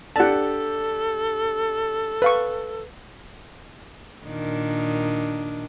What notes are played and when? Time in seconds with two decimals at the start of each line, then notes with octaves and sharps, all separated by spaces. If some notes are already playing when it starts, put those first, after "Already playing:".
0.16 D4 G4 A4 F#5 A5
2.22 B4 F5 C#6
4.25 A#2 D#3 D4